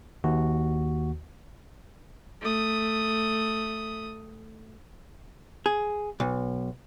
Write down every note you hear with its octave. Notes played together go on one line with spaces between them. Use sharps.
D#2 F#4
A3 D#6
G#4
B1